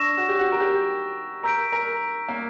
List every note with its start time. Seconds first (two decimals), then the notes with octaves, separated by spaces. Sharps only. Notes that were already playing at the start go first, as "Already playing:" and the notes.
Already playing: D4 C#6 E6 A#6 E7
0.17 F#4
0.28 G4
0.39 F#4
0.52 A#4
0.60 G4
1.43 A#4 A#5 E6 G6 B6 D7
1.72 A#4
2.28 A#3